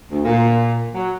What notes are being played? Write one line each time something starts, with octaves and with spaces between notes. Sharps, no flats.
D2
A#2
F#3